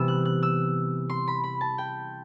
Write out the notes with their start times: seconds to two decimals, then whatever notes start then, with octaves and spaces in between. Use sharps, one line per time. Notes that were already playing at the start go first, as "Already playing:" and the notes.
Already playing: C3 E3 G3 B3 E6
0.08 F#6
0.25 F#6
0.43 E6
1.10 C6
1.28 B5
1.44 B5
1.61 A5
1.78 G5